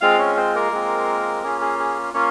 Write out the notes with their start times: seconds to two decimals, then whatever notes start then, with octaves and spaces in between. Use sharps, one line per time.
0.01 G#3 C4 F4 F5
0.19 C#4 C#5
0.36 C4 C5
0.55 A#3 A#4
0.72 G#3 C4 F4
1.43 A#3 C#4 F4 G#4
1.61 G#4
1.79 G#4
2.14 A#3 C#4 F4 C#5